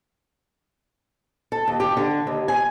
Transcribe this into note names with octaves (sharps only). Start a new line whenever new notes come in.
A4
D#2
G4
D3
D#2
G#5